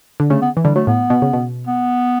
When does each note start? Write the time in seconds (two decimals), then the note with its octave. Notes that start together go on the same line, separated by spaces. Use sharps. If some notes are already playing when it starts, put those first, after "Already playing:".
0.20 D3
0.30 C#3 A3
0.42 B3
0.57 E3
0.64 D3 G3
0.75 F#3 A3
0.87 A2 B3
1.10 B2
1.22 C#3
1.33 B2
1.67 B3